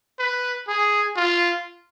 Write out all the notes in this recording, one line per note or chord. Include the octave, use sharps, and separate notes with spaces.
B4
G#4
F4